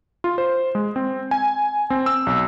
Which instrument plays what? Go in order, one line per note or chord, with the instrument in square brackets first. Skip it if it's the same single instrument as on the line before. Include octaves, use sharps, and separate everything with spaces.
[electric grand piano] F4
C5
G#3
C4
G#5
C4
E6
B1